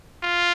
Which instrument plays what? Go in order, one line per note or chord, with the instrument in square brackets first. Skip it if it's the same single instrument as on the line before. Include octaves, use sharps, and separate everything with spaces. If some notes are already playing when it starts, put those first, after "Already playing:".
[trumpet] F4